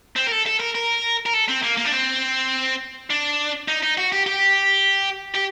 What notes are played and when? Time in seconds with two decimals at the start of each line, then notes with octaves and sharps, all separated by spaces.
0.16 C4
0.27 A#4
0.32 A4
0.46 A4
0.60 A#4
0.75 A#4
1.26 A#4
1.34 A4
1.49 C4
1.63 A#3
1.77 A#3
1.85 D4
1.92 C4
3.10 D4
3.68 D#4
3.83 D#4
3.98 F#4
4.12 G4
4.26 G4
5.34 G4